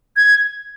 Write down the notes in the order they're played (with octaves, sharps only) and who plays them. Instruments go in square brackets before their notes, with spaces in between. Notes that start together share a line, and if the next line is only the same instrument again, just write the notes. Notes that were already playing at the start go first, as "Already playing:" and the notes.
[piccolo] G#6